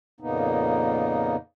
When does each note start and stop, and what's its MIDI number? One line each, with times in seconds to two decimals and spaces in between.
0.20 1.36 41
0.20 1.36 46
0.20 1.36 49
0.20 1.36 58
0.20 1.36 59
0.20 1.36 63